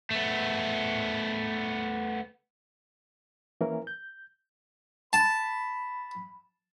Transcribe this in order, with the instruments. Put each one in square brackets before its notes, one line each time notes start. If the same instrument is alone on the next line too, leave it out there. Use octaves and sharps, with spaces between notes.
[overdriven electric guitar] A3 B3
[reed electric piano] E3 A#3 C#4 E4 A#4
G6
[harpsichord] A5 [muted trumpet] B5